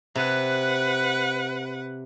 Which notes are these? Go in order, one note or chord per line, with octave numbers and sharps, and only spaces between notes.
C3 B4 F#5